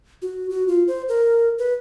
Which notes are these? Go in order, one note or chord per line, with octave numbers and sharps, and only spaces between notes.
F#4
F#4
F4
C5
A#4
B4